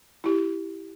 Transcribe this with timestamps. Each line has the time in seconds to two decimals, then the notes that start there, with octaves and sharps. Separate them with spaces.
0.24 E4 G4